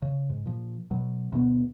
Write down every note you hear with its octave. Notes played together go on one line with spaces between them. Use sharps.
C#3
G#2
A#2 F3
B2 F#3
D2 B2 B3